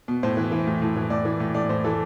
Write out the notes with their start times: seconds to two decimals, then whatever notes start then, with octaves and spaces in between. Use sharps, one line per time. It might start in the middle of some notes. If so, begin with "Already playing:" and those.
0.08 B2
0.23 A2 C5
0.37 E3
0.52 E3
0.67 A2
0.82 A2
0.96 E3
1.10 A2 D5
1.25 E3
1.40 A2
1.54 A2 D5
1.69 A2 C5
1.84 E3 A4